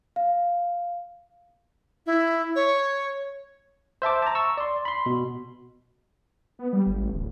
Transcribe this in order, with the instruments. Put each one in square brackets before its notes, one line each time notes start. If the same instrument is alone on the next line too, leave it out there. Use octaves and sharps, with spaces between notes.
[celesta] F5
[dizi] E4
C#5
[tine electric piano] C5 E5 A5 D6
A5 A#5
C#6 E6
D5 C6
B5 C6
B2
[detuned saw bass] B3
G3
G1
A1
D1